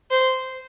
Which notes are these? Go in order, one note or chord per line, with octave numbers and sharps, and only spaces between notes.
C5